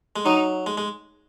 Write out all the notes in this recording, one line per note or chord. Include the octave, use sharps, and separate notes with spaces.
G#3
F#3 D#4
G#3
G#3